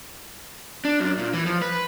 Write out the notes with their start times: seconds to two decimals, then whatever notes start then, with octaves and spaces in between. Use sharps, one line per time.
0.85 D4
1.00 F#2
1.18 A#2
1.33 E3
1.46 F3
1.62 B4